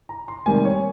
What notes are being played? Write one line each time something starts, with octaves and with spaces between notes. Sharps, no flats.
A#5
C6
C3 D#3 G3 A#3 G#5
C#5